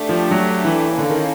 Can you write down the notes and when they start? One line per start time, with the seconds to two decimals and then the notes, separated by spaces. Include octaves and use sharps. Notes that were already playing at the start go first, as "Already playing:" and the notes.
Already playing: A3 D4 G4
0.09 F3
0.31 F#3
0.65 E3
0.98 D3 A#3 C#4 E4 A4
1.10 D#3